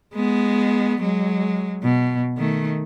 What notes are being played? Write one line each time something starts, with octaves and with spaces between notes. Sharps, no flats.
G#3 B3
F#3 G#3
B2
D#3 A3